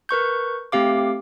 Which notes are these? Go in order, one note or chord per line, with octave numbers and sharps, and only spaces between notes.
A#4 B4 C#6 G6
A3 C4 G4 F5 D6